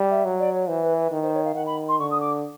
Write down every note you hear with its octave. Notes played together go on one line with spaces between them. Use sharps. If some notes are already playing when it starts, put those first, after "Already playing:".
Already playing: G3
E5
F#3
D5
C#5
E3 C5
B4
B4
D#3
C5
C#5
F5
D#3 F#5
B5
C6
D3 C#6
D#6
D6